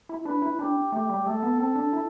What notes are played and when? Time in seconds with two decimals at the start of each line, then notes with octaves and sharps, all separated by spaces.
0.09 E4
0.25 D4 B4
0.42 E4
0.59 D4 G4
0.92 A3 G4
1.09 G3
1.26 A3 A4
1.43 B3
1.59 C4 A4
1.76 D4
1.93 E4